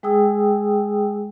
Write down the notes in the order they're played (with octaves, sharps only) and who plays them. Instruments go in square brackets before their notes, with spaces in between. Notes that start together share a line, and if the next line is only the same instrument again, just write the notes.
[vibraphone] G#3 G#4 G5 D#6 E6